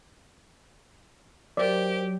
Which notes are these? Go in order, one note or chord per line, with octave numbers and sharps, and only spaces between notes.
F#3 G4 A#4 C5 D5 E5